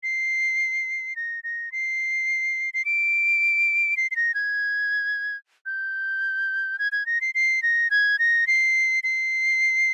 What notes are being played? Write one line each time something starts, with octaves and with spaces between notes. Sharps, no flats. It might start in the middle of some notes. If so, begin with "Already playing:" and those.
C7
A#6
A#6
C7
C7
D7
C7
C7
A#6
G#6
G6
G#6
G#6
A#6
C7
C7
A#6
G#6
A#6
C7
C7